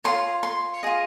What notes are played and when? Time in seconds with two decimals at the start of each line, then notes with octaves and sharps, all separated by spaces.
0.04 F4 G#4 C#5 C6
0.43 C6
0.83 F4 G#4 D#5